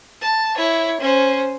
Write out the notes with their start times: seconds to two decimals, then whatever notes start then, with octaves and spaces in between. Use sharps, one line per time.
0.21 A5
0.57 E4 C#5
1.01 C#4 C5